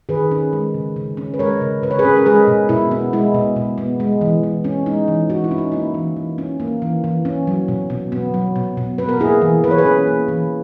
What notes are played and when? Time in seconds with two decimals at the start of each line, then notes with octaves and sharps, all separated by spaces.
0.09 D#3 G#4 B4
0.31 C#4
0.53 G#3
0.74 C#3
0.96 C#3
1.17 C#4
1.34 B4
1.39 G#3 A#4 C#5
1.61 C#3
1.82 C#3 B4
1.91 C#5
1.99 G#4 B4
2.05 C#4
2.17 A#4
2.26 G#3 G#4 B4
2.47 B2
2.69 B2 E4
2.91 B3
3.13 G#3 E4
3.34 B2
3.56 B2
3.78 B3
4.00 G#3
4.21 E3
4.43 E3
4.64 C#4
4.86 G#3 D#4
5.08 E3
5.30 E3 F#4
5.44 E4
5.51 C#4
5.58 D#4
5.72 A#3 E4
5.94 E3
6.17 E3
6.38 C#4
6.60 A#3
6.82 E3
7.04 E3
7.25 C#4
7.47 F#3
7.68 B2
7.90 B2
8.12 B3
8.34 F#3
8.56 B2
8.77 B2
8.98 B3 B4
9.09 A#4
9.20 A#3 E4 G#4
9.42 E3
9.64 E3 B4
9.71 C#5
9.78 G#4 B4
9.86 C#4
10.07 A#3
10.28 E3